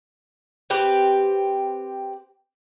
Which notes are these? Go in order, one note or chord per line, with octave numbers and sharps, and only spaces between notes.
C4 G4 B4